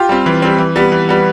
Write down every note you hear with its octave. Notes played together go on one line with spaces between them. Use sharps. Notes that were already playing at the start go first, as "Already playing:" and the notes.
Already playing: F4 G4
G3 C4
E3
G3 C4
E3
G3 B3
E3
G3 B3